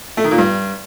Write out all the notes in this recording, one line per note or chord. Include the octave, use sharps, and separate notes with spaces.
A3
D#3
A#2
G2